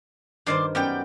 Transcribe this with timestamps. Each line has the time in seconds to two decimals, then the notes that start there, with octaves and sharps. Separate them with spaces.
0.47 G2 D#3 C5 D5 C6 D6
0.75 F#2 B3 G4 A#4 D5 G5